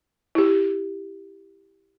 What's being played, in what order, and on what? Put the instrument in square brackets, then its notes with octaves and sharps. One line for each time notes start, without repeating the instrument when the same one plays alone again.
[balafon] E4 G4